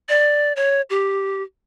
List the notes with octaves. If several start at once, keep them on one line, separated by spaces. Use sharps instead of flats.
D5
C#5
G4